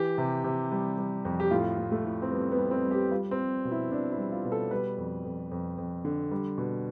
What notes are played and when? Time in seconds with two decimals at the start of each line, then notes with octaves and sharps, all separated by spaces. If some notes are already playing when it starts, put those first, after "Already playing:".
Already playing: E3 G4
0.18 C3
0.44 C3
0.72 G3
0.98 G3
1.25 F2
1.40 G4
1.51 A2 F4
1.78 A2
1.92 A3
2.05 A2
2.22 C4
2.32 G3 B3
2.52 B3
2.58 G3
2.71 C4
2.85 G3
2.91 G4
3.11 G3 F4
3.31 C4
3.38 G3
3.65 B2
3.71 E4
3.91 B2 D4
4.12 E4
4.18 G3
4.32 F4
4.45 B2
4.52 A4
4.71 G3 B4
4.98 F2
5.25 F2
5.51 F2
5.78 F2
6.05 D3
6.31 G3
6.58 B2